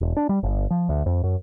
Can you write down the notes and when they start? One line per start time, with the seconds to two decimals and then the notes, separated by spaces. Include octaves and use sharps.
0.01 E1
0.17 D4
0.29 G3
0.43 G1
0.71 F3
0.89 D2
1.06 F2
1.24 F#2